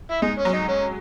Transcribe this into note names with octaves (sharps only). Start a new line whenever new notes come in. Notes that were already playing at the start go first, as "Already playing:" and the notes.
E4
G#3 D#4
C#4
F#3
D#4
C#4